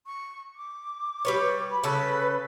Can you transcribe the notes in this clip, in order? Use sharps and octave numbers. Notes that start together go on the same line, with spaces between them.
C#6
D6
G3 B4 C#5
B5
C#3 A4 B4